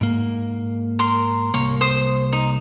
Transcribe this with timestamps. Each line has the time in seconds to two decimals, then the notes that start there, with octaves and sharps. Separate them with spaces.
0.01 G#2 A#3
0.99 A#4 C6
1.54 C2 A#3 C#5
1.81 C5 D#6
2.33 D#4